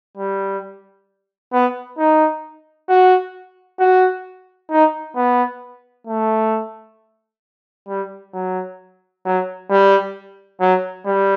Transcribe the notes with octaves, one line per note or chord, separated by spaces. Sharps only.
G3
B3
D#4
F#4
F#4
D#4
B3
A3
G3
F#3
F#3
G3
F#3
G3